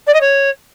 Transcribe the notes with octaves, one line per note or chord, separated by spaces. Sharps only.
D5
D#5
C#5